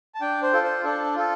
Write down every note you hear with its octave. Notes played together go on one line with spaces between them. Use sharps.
A5
D4 G5
C5
F4 A4
C5
D4 A4
F4 A4